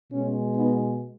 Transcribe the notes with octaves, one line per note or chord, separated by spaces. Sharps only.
B2 G#3 C#4
B3 D#4